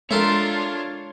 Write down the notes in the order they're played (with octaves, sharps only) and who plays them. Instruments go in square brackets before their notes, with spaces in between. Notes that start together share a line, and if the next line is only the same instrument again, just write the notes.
[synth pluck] G#3 [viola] D4 F4 [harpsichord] A4 A#4 E5 [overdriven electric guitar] C#5 C6